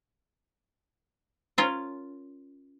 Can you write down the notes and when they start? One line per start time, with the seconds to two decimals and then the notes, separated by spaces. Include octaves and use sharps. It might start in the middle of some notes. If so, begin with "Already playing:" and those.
1.58 C#4 F4 A#4